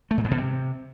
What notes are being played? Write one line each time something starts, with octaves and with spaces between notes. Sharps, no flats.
A3
A#2
G#2
B2
C3